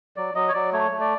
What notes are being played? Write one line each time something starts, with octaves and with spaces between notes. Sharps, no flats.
F#3 D5
F#3 D#5
C#5
F#3 D5
A3 C#5
A3
D5